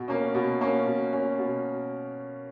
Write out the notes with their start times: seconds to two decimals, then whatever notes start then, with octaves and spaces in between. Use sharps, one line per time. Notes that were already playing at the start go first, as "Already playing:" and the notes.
Already playing: B2
0.08 A#3 C#4
0.35 B2
0.61 A#3 C#4
0.87 B2
1.13 A#3 C#4
1.39 B2